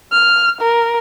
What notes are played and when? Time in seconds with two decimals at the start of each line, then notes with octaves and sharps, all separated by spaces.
0.11 F6
0.61 A#4